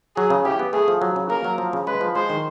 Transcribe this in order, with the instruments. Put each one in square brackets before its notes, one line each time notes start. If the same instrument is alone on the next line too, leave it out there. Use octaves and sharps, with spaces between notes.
[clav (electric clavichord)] F#3 [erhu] G#4
[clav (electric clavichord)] C#3
[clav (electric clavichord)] E4 [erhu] G4
[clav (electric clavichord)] B3
[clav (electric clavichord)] A3 [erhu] G#4
[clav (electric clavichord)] F3
F#3
C#3
[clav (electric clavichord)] A#3 [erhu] A#4
[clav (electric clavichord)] F#3
F3
C#3
[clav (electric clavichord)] G#3 [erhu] B4
[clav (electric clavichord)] F3
[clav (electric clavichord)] G#3 [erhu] C5
[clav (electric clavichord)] D#3